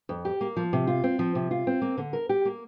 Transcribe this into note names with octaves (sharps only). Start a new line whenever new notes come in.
F2
G4
A#3
F3
C3
F4
C4
F3
C3
F4
C4
A#3
D3
A#4
G4
A#3